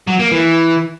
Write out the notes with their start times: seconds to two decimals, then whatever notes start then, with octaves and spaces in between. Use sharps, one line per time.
0.07 F#3
0.19 A#3
0.31 E3